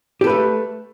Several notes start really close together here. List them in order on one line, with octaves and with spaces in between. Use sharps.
G4 A4 B4 A3